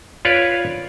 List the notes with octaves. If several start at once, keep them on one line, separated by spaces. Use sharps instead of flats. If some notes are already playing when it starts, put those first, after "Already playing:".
F4 B4 C#5 D5